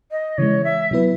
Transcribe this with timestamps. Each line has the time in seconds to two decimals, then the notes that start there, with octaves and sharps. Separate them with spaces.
0.11 D#5
0.38 C#3 E3 G#3 C#5
0.64 E5
0.91 B2 F#3 B3 E4 B4